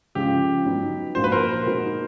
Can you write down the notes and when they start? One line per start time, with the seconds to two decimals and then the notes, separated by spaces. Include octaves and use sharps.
0.15 C#3 F3 G#3 C#4 F4 G4
0.65 F#3 B3 D#4
1.15 A#2 F3 A#3 D4 F#4 C5
1.24 B4
1.32 A#4 C5
1.65 B2 G#3 B3 D#4 F#4